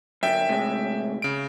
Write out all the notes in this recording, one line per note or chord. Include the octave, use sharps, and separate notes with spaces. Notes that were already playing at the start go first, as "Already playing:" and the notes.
F#2 D3 E5 G5
A2 C3 G#3
C#3 D7